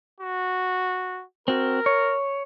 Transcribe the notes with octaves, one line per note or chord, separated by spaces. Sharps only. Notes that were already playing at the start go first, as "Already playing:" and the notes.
F#4
C4 F#4 A#4
C#5